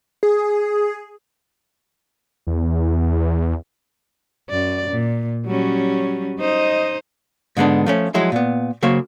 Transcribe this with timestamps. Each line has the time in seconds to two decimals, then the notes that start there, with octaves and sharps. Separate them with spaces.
0.23 G#4
2.47 E2
4.50 F#2 D5
4.91 A#2
5.46 F#3 G3 C#4
6.40 D#4 C5 D#5
7.57 G#2 D3 G#3 B3 D4
7.86 F3 A3 C#4
8.14 F3 F#3 G#3 E4
8.32 A#2 B3
8.83 C#3 F#3 A#3 C5 C#5